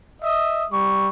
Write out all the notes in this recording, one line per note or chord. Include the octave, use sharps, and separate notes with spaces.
D#5 E5 D#6
G3 C#6